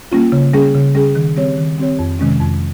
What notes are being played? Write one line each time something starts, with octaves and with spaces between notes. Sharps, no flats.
G3 A#3 C#4 F4
C#3
G3 C#4 G#4
C#3
G3 C#4 G#4
D#3
G3 C4 G4 C#5
D#3
G3 C4 G4 C#5
F2
C3 D#3 G#3 C#4
F2